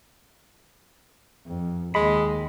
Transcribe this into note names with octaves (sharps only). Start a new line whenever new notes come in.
F2
D#2 G#3 B5